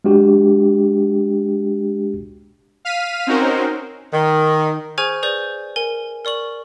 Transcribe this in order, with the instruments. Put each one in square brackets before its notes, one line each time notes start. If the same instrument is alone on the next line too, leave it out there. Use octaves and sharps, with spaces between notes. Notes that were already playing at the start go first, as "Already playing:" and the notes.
[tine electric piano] G#3 D4 F#4 G4
[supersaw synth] F5 F6 B6 D#7
C4 C#4 D#4 F#4 A#4 C5
[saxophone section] D#3
[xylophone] G#4 C5 G#5 C#6 F6 G#6
G#4 B4 D5 G6
A#4 G#5
A#4 D5 C#6 F#7